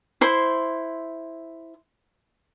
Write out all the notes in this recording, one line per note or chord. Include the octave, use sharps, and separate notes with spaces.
E4 C5 C6